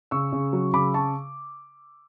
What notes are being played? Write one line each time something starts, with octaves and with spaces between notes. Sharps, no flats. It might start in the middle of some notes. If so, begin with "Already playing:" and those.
C#3 C#6 E6
C#3
F#3
C#3 B5 D6
A5 C#6